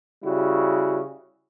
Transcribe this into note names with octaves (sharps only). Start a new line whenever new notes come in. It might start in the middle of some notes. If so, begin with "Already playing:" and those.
C#3 G3 E4 F#4